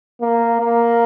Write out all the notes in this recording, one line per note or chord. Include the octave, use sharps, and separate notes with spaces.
A#3
A#3